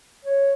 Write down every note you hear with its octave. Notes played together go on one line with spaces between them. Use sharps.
C#5